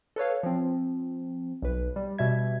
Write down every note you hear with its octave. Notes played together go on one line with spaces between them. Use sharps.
A4 B4 C#5 F5
F3 C4
B1 B4
G3
B2 G3 E5 G#6